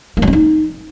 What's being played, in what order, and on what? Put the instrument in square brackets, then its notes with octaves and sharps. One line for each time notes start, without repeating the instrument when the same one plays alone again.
[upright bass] A#3
F#3
C4
D#4